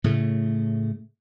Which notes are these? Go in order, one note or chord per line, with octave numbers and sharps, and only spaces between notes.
A2 C#3 A3